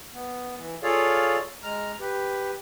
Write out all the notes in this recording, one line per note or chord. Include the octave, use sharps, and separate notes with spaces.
B3
E3
F4 G#4 A4 C#5 D5 F5
G#3 A#5 F6
G4 B4